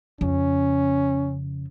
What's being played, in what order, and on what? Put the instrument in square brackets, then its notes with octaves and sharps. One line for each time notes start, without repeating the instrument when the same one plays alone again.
[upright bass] F2 C#3 [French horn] C#4